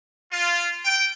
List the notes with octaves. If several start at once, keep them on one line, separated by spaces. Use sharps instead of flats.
F4
G5